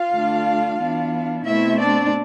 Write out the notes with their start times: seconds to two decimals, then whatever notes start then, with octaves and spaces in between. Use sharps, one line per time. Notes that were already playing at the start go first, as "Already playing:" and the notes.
Already playing: F4 F5
0.11 D3 A3 D4
0.78 E3 B3 D4
1.44 B2 A3 C4 E4 E5
1.78 D4 D5